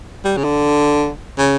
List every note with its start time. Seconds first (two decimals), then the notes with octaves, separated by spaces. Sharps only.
0.25 G3
0.37 C#3
0.44 D3
1.39 C#3